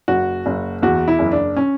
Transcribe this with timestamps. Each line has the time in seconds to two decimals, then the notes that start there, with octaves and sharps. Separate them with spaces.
0.08 F#1 F#4
0.46 F#1
0.82 E2 F#4
1.08 E4
1.19 F#1
1.32 D4
1.57 C#4